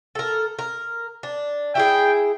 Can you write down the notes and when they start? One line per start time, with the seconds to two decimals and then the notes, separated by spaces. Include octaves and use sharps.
0.15 A4 A#4
0.59 A#4
1.23 D4
1.75 E4 G4 G#4 G5